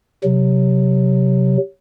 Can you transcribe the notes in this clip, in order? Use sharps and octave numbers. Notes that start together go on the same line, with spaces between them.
C3 F#3